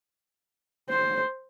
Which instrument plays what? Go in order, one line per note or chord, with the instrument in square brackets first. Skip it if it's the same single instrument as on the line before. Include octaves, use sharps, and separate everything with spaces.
[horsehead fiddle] C5